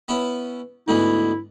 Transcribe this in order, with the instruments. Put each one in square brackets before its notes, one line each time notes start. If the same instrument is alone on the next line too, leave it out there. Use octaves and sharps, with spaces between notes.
[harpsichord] B3 C#4 E4
[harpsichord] D2 G#2 B3 [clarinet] E4